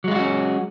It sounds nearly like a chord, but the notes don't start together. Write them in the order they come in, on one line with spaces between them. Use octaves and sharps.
F#3 G#3 F4 F#4 C#4